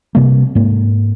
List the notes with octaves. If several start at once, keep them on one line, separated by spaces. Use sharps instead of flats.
C3 G3 A#3
G#2 A#3